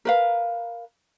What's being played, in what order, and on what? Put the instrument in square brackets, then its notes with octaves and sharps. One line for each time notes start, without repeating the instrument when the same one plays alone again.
[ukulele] A#4 B4 F5